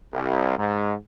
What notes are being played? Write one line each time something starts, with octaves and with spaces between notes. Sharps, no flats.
C2
G#2